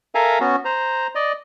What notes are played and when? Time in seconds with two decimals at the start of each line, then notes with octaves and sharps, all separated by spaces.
0.15 A4 A#4 E5 F5 G#5 A#5
0.41 B3 C#4 F#4
0.65 C5 A#5
1.15 D5 D#5